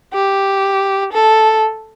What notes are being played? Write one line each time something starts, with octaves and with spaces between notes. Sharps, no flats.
G4
A4